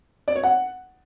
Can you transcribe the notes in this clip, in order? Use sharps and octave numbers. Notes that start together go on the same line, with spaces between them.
D5
C#5
F#5